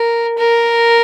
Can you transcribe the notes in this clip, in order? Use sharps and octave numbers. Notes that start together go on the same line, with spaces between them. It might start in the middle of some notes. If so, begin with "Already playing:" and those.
Already playing: A#4
A#4